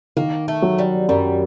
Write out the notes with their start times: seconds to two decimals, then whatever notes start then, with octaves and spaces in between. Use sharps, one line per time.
0.16 D#3 A#3
0.48 A3
0.62 F#3
0.78 G3
1.08 F#2 G3